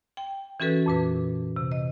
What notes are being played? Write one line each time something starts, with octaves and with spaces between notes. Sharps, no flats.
G5
E3 C#4 F#4 A4 B4
F2 A#2 B4
C3
D#5